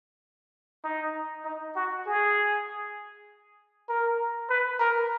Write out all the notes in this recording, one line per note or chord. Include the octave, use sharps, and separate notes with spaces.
D#4
D#4
F#4
G#4
A#4
B4
A#4